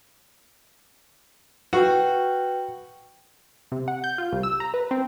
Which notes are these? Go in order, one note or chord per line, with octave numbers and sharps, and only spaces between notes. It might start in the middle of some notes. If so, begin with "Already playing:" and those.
F#4 B4 G5
C3
F#5
G6
F4
C2
E6
A#5
B4
C4